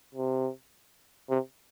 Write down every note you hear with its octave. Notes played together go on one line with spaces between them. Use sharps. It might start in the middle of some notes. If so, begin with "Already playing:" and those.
C3
C3